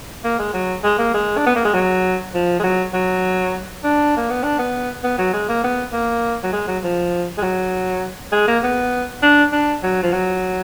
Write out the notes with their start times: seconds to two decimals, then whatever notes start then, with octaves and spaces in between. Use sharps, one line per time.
0.24 A#3
0.39 G#3
0.54 F#3
0.84 G#3
0.99 A#3
1.14 G#3
1.37 D4
1.46 B3
1.55 A#3
1.65 G#3
1.74 F#3
2.34 F3
2.59 G#3
2.63 F#3
2.93 F#3
3.84 D4
4.17 A#3
4.30 B3
4.43 D4
4.59 B3
5.04 B3
5.19 F#3
5.33 G#3
5.49 A#3
5.64 B3
5.93 A#3
6.43 F#3
6.53 G#3
6.68 F#3
6.83 F3
7.38 G#3
7.43 F#3
8.32 G#3
8.48 A#3
8.63 B3
9.23 D4
9.52 D4
9.83 F#3
10.03 F3
10.12 F#3